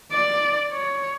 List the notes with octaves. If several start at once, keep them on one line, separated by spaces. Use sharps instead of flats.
D5
C#5